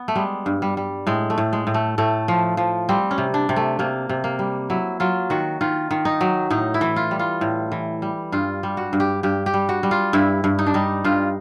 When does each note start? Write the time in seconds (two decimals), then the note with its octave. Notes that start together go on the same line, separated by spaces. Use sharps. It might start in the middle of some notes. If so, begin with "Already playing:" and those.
Already playing: B3
0.08 A3
0.16 G3 G#3
0.46 G2
0.62 G3
0.77 G3
1.07 A2 G#3
1.30 A3
1.38 A2
1.53 G#3
1.67 A2
1.74 A3
1.98 A2 A3
2.28 F3
2.57 F3
2.89 G3 C4
3.11 C#4
3.18 C3
3.34 D4
3.49 C3
3.56 A3
3.79 C3 A#3
4.09 C3
4.24 A#3
4.39 G3
4.70 F#3 E4
5.00 F#3 F4
5.30 D#3 F#4
5.61 D#3 F4
5.91 D#3
6.05 D#4
6.21 F#3
6.50 A2 D#4
6.74 E4
6.81 E3
6.96 F4
7.11 G3
7.19 F4
7.41 A2
7.72 E3
8.02 G3
8.32 G2 F4
8.63 G3
8.77 F#4
8.93 G2
9.00 G4
9.23 G2 G4
9.46 G4
9.54 G3
9.69 F#4
9.83 G3
9.91 F4
10.13 G2 E4
10.44 G2
10.59 D#4
10.67 D4
10.74 G3 D#4
11.04 G2 F4